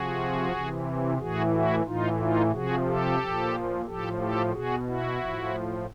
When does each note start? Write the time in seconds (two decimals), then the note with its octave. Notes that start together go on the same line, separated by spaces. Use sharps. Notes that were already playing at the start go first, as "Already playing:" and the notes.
Already playing: C3 F3 F#4 G#4
0.52 C3 E3
1.18 A2 E3 F#4 G#4
1.52 E4 F#4
1.85 A2 E3 D#4 F4
2.19 D#4 F4
2.52 C3 F3 F#4 G#4
2.85 G4 A4
3.19 A#2 F3
3.85 A2 F3 G4 A4
4.18 G4 A4
4.52 B2 F#4 G#4
4.86 E4 F#4
5.19 A2 F3